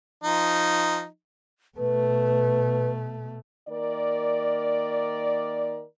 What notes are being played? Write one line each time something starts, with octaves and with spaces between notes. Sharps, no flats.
F3 D#4
B2 A3 B4
D#3 A#3 A#4 D5